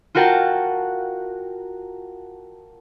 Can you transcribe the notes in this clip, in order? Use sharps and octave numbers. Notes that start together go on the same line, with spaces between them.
F4 F#4 A#4 F#5 G5 A5